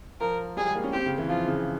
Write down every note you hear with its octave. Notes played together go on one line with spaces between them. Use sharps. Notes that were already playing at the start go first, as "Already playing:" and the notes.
F3 A#4
G3 G#4
G#3
A#3
C#4
C4 G4
C#3
E3
F3 F4
C#3